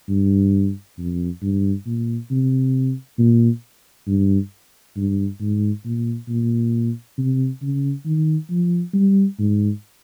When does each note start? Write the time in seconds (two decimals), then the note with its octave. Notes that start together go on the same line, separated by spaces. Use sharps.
0.09 G2
0.98 F2
1.42 G2
1.86 A#2
2.31 C3
3.18 A#2
4.07 G2
4.96 G2
5.40 G#2
5.85 A#2
6.28 A#2
7.18 C3
7.62 C#3
8.05 D#3
8.50 F3
8.94 G3
9.39 G#2